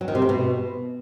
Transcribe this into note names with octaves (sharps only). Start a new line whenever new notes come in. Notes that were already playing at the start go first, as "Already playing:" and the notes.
F#3
D#3
C3
A3
B2